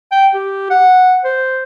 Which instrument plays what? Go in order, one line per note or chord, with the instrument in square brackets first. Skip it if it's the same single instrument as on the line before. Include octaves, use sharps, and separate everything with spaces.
[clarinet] G5
G4
F#5
C5